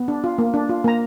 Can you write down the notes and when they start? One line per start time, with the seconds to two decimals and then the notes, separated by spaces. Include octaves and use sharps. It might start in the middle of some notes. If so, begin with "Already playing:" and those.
Already playing: B3
0.08 D4
0.24 F4
0.38 A#3
0.54 D4
0.69 F4
0.84 A#3 A#5